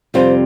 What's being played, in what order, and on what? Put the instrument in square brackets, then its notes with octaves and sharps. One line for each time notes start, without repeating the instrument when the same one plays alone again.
[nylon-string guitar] F2 C3 G3 C4 F4 [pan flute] C5